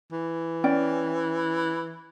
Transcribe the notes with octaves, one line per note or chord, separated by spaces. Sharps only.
E3
C#4 D5 G5